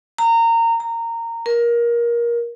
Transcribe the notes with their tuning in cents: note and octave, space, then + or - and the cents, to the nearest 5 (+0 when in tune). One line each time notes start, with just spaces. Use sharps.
A#5 -25
A#5 -20
A#4 +20